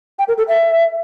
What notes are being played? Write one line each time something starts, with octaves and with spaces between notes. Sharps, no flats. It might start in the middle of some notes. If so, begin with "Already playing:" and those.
G5
A#4
A4
E5